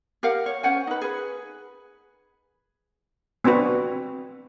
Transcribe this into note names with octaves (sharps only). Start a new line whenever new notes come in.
G4 A#4 F5 F#5
C#5
C#4 C5 F#5 G#5
D#4 B4
G#4 B4
B3 C4 D4 F#4 B4